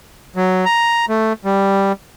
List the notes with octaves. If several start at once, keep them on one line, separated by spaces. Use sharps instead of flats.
F#3
A#5
A3
G3